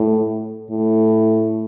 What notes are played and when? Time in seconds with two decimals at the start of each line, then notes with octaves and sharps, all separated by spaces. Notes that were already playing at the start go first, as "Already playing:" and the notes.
Already playing: A2
0.70 A2